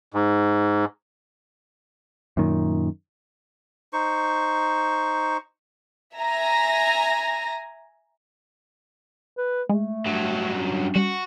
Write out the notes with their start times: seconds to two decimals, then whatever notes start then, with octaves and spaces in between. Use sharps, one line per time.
0.14 G#2
2.37 F#2 A#2 D#3
3.93 D#4 C5 C#6
6.16 E5 G#5 A#5 A#6
9.37 B4
9.70 G#3 A3
10.06 G2 F#3
10.55 C#4
10.96 G3 F#4